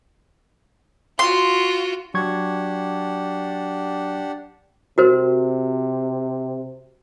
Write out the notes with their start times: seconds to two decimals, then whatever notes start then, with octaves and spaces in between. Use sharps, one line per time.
1.19 F4 F#4 C6
2.14 F#3 D4 G4 F#5 C#6 G#6
4.98 C3 F#4 A#4 C5